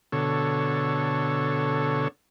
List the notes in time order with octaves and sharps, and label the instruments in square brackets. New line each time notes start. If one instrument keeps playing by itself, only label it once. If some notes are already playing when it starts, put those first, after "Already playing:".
[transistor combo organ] B2 D3 A4 C#5